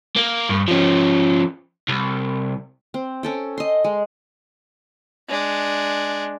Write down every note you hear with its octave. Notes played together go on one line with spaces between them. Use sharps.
A#3
G2
F3 C#4
C2
C4
C#4 A4 G5
D#5 C6
G#3
G#3 D4